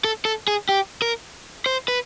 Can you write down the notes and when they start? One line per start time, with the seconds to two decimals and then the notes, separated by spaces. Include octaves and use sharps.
0.04 A4
0.25 A4
0.48 G#4
0.69 G4
1.02 A#4
1.66 C5
1.88 B4